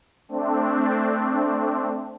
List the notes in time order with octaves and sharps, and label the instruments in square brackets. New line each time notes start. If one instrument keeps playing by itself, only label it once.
[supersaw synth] A3 C4 D4